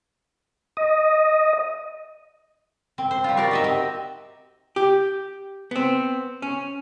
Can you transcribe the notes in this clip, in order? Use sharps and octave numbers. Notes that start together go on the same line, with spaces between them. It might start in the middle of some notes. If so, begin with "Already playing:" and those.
D#5
C4
C5
G3 F4
F#4 G4 A#4 D5
D#4 D#5 E5
C4
G4
B3 C4
C#4